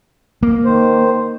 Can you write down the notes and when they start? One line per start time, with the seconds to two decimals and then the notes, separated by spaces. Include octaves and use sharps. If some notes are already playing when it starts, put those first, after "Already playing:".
0.43 A#3
0.65 D#3 C5